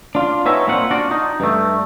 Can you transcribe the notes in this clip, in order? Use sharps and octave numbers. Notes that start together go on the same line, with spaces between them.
D4 F4
B3 D#4 C#5 E5 G#5
A#2 A#3 C4 F4 F#5
D4 F4 F#4 D5
D#4
G2 A3